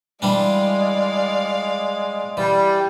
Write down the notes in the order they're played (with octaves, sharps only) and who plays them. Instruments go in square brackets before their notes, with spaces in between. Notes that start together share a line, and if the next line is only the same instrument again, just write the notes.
[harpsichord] E3 G3 D4 [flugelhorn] G#3 [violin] D5 F5
[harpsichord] E3 [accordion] G3